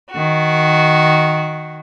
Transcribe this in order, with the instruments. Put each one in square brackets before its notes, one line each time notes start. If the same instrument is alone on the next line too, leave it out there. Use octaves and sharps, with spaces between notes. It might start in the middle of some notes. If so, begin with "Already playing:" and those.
[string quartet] D#3 F#4